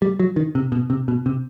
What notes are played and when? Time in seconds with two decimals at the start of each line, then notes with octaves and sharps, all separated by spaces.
0.02 G3
0.19 F#3
0.36 D#3
0.55 C3
0.72 B2
0.90 C3
1.08 B2
1.26 C3